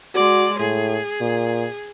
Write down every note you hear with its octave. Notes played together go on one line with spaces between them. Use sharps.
G#3 F#4 D5
A2 G#4
A#2